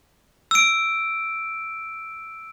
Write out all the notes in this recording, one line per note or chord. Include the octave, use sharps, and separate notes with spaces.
E6 D7